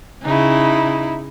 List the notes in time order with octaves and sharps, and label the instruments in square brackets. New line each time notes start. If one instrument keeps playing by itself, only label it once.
[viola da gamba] C#3 [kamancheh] D#4 E4